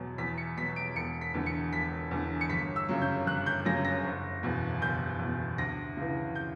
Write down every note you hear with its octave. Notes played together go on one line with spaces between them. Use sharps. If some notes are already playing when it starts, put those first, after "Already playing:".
Already playing: E2 B2 F#3
E2 B6
C#7
B2 F#3 B6
D7
E1 C#7
B6
E2 D3
C#7
E1 B6
E2 D3
C#7
G1 B6
E6
F#2 C#3 F#3
G6
G1 F#6
G6
F#2 C#3 F#3 A#6
A#6
F#1
E2 B2
F#1 G6
E2 B2
D2 A#6
C#3 E3
G6